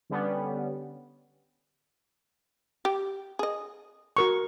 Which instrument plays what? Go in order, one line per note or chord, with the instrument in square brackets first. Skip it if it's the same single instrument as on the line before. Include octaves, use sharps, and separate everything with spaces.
[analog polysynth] D3 G3 B3 C#4
[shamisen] G4
G#4 D#5
[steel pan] F#4 A#4 C#6